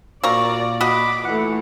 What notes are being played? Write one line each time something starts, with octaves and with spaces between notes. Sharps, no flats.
A#2 A#3 F#4 D5 A#5 C#6
F#4 D#5 B5 D6
E3 A3 F#5